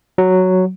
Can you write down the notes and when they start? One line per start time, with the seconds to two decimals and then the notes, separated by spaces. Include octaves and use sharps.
0.18 F#3